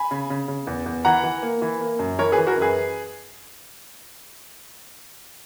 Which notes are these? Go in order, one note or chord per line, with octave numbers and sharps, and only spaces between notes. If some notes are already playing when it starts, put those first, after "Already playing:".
Already playing: G#5 B5
C#3
C#3
C#3
E2
E2
E3 F#5 A#5
E3
A#3
E3
A#3
F#2
E3 A#4 C#5
G#4 B4
E3
F#4 A#4
F#2 G#4 B4